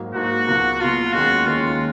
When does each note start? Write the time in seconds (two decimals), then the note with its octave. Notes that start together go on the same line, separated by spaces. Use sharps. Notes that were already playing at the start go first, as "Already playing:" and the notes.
Already playing: G#2 F#3 A#3
0.14 G#2 F#3 A#3 F#4
0.47 C#2 B2 F#3 A#3
0.80 C#2 B2 F#3 A#3 F4
1.13 D#2 D#3 G#3 C#4 F#4
1.46 D#2 D#3 G#3 C#4 F4